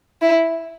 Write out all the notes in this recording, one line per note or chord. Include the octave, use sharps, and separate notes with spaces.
E4